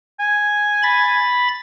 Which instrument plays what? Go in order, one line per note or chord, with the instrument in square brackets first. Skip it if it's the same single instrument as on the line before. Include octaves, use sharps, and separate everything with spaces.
[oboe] G#5
[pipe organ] B5 A6